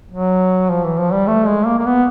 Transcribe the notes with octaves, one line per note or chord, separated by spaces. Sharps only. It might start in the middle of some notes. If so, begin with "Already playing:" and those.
F#3
F3
E3
F3
G3
A3
G#3
A#3
A#3
B3